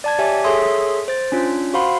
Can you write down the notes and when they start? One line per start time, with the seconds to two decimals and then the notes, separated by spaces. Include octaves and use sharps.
0.04 D5 A5 G#6
0.18 G4 C#5 E5 G#5
0.44 G#4 A4 C#5 E5 C6 D#6
1.08 C5 A6
1.32 C#4 D4 F4
1.74 F#4 C5 F5 F#5 B5 C6